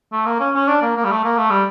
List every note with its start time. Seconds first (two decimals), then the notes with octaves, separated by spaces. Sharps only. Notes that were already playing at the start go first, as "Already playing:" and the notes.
0.13 A3
0.26 A#3
0.40 C#4
0.55 C#4
0.68 D4
0.82 A#3
0.97 A#3
1.04 G3
1.11 A3
1.24 A#3
1.38 A3
1.50 G3